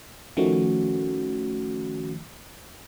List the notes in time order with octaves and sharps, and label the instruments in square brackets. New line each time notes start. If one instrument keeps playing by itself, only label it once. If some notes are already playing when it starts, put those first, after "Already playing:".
[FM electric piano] D#3 F3 A3 [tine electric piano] C#4 F#4